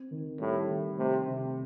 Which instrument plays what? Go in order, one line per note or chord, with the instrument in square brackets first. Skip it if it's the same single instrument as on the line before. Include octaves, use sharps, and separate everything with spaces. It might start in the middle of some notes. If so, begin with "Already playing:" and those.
Already playing: [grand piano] C4
D#3
[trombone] A2 [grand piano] G3
[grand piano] D#3
[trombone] C3 [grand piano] A3
[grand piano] C3